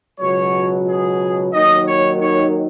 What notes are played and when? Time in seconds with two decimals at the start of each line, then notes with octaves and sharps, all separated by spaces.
0.19 C#2 B2 F#3 C#5
0.87 G#4
1.53 D#2 D#3 F#3 D#5
1.85 C#5
2.19 C#5